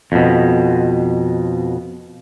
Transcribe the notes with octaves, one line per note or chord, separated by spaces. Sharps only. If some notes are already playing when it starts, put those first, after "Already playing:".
F2 B2